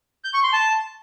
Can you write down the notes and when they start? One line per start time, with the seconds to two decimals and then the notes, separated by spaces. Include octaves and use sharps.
0.24 G6
0.34 C#6
0.43 C6
0.53 A5